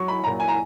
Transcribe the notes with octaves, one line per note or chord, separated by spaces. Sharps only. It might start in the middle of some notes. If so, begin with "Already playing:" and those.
Already playing: F#3 C#6
B5
A#2 F#3 A#5
G#5
A#5